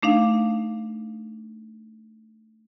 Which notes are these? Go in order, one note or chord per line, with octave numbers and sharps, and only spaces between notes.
A3 D4 D#4 F5